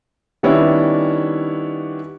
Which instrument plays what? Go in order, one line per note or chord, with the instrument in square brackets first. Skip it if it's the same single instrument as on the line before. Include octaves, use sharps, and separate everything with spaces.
[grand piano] D#3 G3 B3 C#4 D4 E4